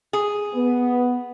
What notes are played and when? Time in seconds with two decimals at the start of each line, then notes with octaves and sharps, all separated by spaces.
0.13 G#4
0.53 B3